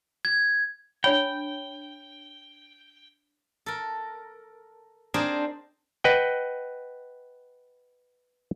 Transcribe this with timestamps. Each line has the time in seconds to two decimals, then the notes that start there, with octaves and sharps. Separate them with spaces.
0.25 G#6
1.04 D4 C#5 G5 B5
3.66 A4 A#4
5.14 C4 D4 D#4 G#4 A#4 C5
6.04 B4 D#5 F#5 G5